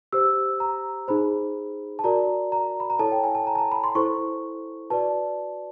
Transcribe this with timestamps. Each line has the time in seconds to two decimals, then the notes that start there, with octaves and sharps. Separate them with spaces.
0.13 G4 C5 E6
0.60 A#5
1.08 D#4 G#4 C5 B5
1.99 A5
2.04 F#4 A#4 D5 A#5
2.52 A#5
2.80 B5
2.90 A#5
2.99 E4 A4 C#5 A5
3.12 G5
3.24 G#5
3.35 A5
3.47 A#5
3.55 A5
3.58 A#5
3.72 B5
3.84 C6
3.95 E4 A4 C5 C#6
4.90 F#4 B4 D5 A5